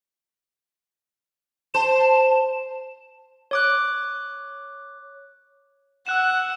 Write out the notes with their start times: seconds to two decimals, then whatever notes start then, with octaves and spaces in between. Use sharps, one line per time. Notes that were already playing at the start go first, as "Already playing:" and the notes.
1.75 C5 A5
3.51 C#5 D6 F#6
6.07 F#5 E6 F#6 E7